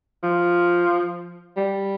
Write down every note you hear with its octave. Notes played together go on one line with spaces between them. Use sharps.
F3
G3